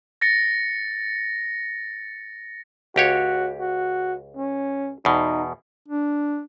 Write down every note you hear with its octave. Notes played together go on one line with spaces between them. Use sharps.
A6 A#6 C#7
C#2 F#4 G4 C#5
F#4
C#4
E2 B2 D#4
D4